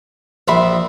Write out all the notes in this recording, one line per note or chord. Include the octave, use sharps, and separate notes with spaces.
A#1 E5 B5 C6